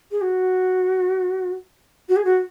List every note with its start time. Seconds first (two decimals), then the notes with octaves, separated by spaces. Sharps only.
0.11 G#4
0.21 F#4
2.09 F#4
2.16 G#4
2.25 F#4